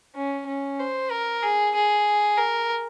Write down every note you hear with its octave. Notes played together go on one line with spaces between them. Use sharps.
C#4
C#4
C5
A#4
G#4
G#4
A#4